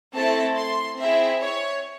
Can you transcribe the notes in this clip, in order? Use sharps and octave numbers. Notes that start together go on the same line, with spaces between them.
A3 C4 E4 A4 A5
C6
C4 E4 G#4 E5
C#5